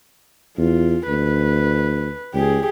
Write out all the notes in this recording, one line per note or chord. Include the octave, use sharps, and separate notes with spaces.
E2 F4
D2 B4
C#2 G4 G#4